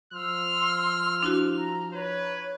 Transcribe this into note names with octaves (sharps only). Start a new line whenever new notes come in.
F3 C6 E6 F6
D4 E4 F#4
A#5
B4 C#5